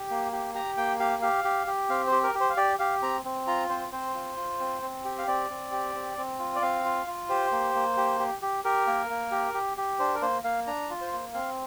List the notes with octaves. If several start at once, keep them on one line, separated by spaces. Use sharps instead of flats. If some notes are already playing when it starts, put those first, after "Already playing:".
Already playing: G4
A#3
G4
G4 A#5
A#3 G5
G4 F5
G4 F5
G4
G4
C4 F5
C5
G4
A#4
G4
C5
F5
G4 D5
G4 F5
C4 A#5
C4
F4 A#5
C4 C5
C4 C5
F4
F4
C4
C4
G4
F5
C4 D5
C4
G4
C4
C4
F4
D5
C4 F5
F4
F4
G4 C5
A#3
A#3
G4
G4
G4
G4 A#4
A#3
A#3
G4
G4
G4
D4 C5
A#4
A#3 C5
A#3 F5
D4 A#5
F4
C5
A#3
C4 F5